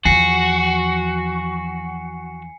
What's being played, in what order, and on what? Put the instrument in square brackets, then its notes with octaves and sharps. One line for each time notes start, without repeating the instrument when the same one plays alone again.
[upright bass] E2 F3 [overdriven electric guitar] F#4 [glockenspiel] G#5 C7 C#7